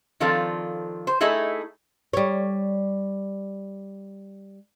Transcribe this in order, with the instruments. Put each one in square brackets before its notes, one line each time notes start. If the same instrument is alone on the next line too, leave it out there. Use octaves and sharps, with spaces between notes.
[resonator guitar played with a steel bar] D#3 F3 C4 F4 A4 D5
C5
A3 D#4 E4 G#4 A4
[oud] G3 C#5